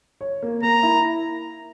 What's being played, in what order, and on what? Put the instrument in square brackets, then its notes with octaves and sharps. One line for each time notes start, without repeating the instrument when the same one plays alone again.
[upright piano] C#5
A#3
[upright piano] A#3 [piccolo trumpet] A#5
[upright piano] E4